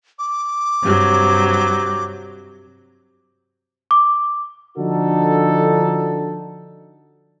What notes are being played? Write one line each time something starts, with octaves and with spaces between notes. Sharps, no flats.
D6
G2 C3 F#3
D6
D3 F3 D4 D#4 F#4 A4